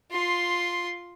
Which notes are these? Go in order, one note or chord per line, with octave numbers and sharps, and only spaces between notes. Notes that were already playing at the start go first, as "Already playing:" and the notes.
F4 C6